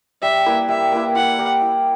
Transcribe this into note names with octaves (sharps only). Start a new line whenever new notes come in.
G3 E5
A#3 E4 B4
G3 E5
A#3 E4 B4
E4 F#5
G4 A#4
E4